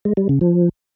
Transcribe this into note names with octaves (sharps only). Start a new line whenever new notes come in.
G#3
G3
C#3
F3